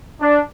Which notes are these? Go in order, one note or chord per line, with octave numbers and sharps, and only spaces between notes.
D4